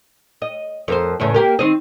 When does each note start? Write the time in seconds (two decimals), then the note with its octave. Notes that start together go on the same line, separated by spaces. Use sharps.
0.42 D#5
0.88 F2 A#4 C5
1.20 E2 A2 C#3
1.34 A#3 G4 A#4
1.59 D#3 C4 D#5